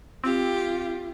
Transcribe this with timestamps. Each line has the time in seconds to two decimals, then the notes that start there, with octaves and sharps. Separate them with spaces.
0.24 C4 F4 G4